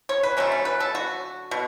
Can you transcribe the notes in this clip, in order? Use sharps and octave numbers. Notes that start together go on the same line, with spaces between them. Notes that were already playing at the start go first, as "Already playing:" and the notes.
C#5
B4
D3 F#3 A3 C#4
C#4
B4
A4
F#4
B2